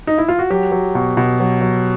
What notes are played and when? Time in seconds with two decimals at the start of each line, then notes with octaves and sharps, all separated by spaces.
0.07 D#4
0.18 E4
0.28 F4
0.39 F#4
0.50 F#3 G4
0.72 F#3
0.95 B2
1.17 B2
1.40 F#3
1.61 F#3